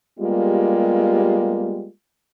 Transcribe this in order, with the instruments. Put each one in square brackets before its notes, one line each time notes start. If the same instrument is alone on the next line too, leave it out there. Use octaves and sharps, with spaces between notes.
[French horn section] G3 G#3 A#3 B3 F4 G4